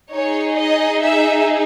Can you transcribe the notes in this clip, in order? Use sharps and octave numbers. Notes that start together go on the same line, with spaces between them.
D#4 G#4 C#5
D#5
E5